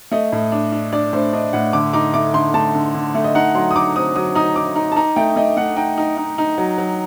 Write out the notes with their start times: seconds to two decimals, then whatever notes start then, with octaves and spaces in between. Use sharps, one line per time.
0.12 A3 D#5
0.32 A2
0.52 D4
0.72 D4
0.93 D4 D5
1.13 A2 C5
1.33 D4 D#5
1.53 A2 F#5
1.73 D3 D6
1.93 D#4 D6
2.14 A3 D6
2.34 D3 C6
2.54 A3 A5
2.74 D3
2.95 D3
3.15 A3
3.24 D#5
3.35 D#4 F#5
3.55 F#3 C6
3.71 D#6
3.75 D#4 D6
3.96 C4 D#6
4.16 F#3 D#6
4.35 D#4 D#6
4.56 D#4 D6
4.76 D#4
4.92 A5
4.96 D#4 A#5
5.16 A3 G5
5.36 A3 D#5
5.57 A3 F#5
5.77 D#4 G5
5.98 D#4
6.17 D#4
6.38 D#4
6.58 F#3
6.78 F#3